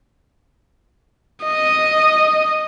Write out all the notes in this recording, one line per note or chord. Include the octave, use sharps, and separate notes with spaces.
D#5